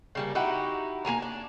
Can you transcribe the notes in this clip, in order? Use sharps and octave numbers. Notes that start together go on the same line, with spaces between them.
C#3 G3 A#3
D#4 E4 F#4 G4
A#3 F#4 G#5 A#5
D4